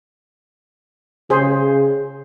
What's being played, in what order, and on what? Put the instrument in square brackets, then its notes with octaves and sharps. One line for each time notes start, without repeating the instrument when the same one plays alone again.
[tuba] C#3 [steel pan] G#4 C5